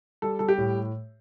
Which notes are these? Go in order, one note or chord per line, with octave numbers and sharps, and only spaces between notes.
G3 A4
G3 A4
G4
A2